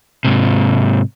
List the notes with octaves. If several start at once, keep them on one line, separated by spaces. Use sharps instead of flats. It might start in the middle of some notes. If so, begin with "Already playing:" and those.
G#2 C3